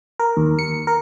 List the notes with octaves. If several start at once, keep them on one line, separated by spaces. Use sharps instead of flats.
A#4
D#2
C#7
A#4